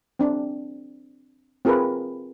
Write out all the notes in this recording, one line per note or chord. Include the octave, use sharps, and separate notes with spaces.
C4 D4
C4 F4 G#4 A#4 B4